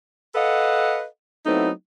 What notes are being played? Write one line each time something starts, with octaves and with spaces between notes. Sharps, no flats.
A4 B4 D#5 F5 F#5
F#3 A3 B3 C4 D#4 E4